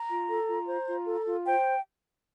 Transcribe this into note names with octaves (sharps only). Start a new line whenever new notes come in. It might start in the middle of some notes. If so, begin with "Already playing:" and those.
Already playing: A#5
F4
A4
F4
C5
F4
A4
F4
C5 G5